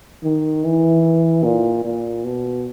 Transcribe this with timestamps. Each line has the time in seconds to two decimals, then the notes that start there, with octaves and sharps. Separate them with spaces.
0.24 D#3
0.64 E3
1.44 A#2
1.85 A#2
2.24 B2